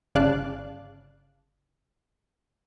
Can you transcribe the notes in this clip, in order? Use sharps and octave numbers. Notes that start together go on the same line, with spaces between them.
G1 C#3 D5 F5 A5 F#6